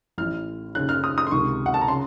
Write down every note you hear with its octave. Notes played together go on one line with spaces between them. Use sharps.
A1 A2 F6
D#2 C#3 F#6
F6
D#6
D#6
C6
C#2 C3 D#3 C#6
F#5
A5
A#5
C#3 C6